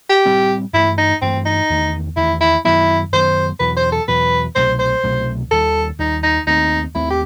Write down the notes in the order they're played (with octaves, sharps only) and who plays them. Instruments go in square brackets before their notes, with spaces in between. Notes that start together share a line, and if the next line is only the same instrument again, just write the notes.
[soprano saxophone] G4
[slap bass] A2 G3 C4
[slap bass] G2 E3 A3 [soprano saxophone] E4
[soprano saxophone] D#4
[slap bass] G2 E3 A3 [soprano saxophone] C4
[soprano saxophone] D#4
[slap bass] E2 D#3 A3
[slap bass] E2 D#3 A3 [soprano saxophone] E4
[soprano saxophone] E4
[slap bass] F#2 D#3 F#3 B3 [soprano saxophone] E4
[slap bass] F#2 D#3 F#3 B3 [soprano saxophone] C5
[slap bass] E2 B2 F#3 [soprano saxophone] B4
[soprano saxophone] C5
A4
[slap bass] E2 B2 F#3 [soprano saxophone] B4
[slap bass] C2 B2 F#3 A3 [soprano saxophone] C5
[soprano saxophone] C5
[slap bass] C2 B2 F#3 A3
[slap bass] D#2 D#3 G3 [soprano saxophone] A4
[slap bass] D#2 D#3 G3 [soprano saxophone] D#4
[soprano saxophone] D#4
[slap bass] D#2 D#3 A3 C4 [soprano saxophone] D#4
[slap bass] D#2 D#3 A3 C4 [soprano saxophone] E4
[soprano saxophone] G4